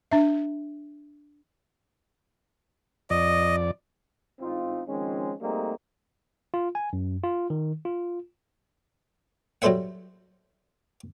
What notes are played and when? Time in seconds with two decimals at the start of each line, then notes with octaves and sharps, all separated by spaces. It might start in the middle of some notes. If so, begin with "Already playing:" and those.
0.11 D4 E5
3.10 F2 D5 D#5
4.40 A1 G#2 C4 D#4 F4
4.87 D#3 F3 G#3 C4 C#4
5.41 G3 A3 A#3 C4 D#4 G#4
6.54 F4
6.75 G#5
6.93 F#2
7.23 F4
7.50 D#3
7.85 F4
9.62 F#3 G3 A4 C5 E5 F#5